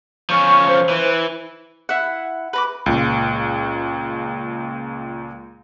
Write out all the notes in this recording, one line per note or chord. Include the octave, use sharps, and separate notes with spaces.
F3 C#4 C#6
C5
E3
E4 F#5
B4 A#5 D6
C#2 A#2